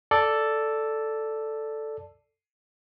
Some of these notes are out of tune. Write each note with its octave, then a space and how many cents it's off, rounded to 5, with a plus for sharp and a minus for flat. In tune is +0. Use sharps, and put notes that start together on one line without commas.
A4 +0 D5 +0